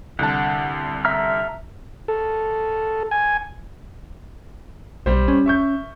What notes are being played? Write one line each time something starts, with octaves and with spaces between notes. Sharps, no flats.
C2 D3 F#5 A5
E5 A#5 F6
A4
G#5
B1 G3 C5
C#4
E5 C#6 G6